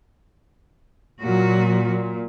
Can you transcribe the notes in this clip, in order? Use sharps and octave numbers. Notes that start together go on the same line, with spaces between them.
A#2 F#3 F#4